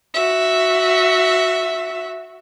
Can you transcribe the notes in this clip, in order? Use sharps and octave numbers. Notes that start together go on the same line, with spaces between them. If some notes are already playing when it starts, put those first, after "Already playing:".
F#4 E5